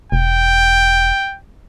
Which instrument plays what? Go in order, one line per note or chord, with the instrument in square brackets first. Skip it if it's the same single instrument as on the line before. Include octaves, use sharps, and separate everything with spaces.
[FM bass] E1 [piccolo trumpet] G5